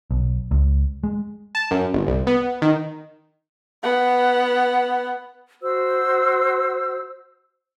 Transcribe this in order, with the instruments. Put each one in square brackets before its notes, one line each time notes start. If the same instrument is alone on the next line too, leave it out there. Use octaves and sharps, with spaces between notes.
[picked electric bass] B1
C#2
G#3
[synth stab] A5
F#2
G1
C2
B3
D#3
[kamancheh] B3 F#5
[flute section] F#4 C5 E6